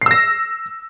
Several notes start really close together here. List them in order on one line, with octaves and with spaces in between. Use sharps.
C7 E6 A#6